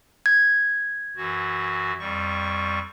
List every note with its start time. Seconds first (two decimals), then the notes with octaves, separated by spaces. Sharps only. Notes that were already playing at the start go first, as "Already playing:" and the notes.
0.26 G#6
1.16 F#2 E3 F#4
1.99 F2 G3 C#6